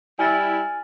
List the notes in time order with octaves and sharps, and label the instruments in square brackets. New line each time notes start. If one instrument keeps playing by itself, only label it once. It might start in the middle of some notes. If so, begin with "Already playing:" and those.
[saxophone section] G3 E4 [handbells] G#5 F6 A6